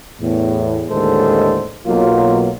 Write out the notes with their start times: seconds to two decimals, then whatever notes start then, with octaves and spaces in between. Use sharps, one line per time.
0.20 E2 A2
0.89 D#2 A2 D3 G#3 A4 C5
1.86 B1 B2 F#3 A#3 F4